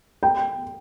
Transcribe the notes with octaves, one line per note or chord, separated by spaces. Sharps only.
G5